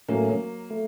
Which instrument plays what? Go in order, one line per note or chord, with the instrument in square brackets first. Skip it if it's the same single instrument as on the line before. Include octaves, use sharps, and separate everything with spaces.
[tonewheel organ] A2 A3 C#4 [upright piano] F#3 A#3
[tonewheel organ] A3